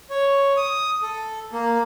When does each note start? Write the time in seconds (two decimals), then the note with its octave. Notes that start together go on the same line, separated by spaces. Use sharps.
0.10 C#5
0.57 D#6
1.02 A4
1.53 A#3